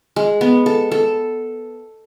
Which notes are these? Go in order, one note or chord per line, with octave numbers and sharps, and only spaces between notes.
G#3
B3
A4
A4